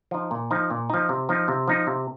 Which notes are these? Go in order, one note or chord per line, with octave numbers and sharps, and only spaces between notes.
F3 D#4
A#2
F3 D#4
A#2
F3 D#4
C3
F3 D#4
C3
F3 D#4
C3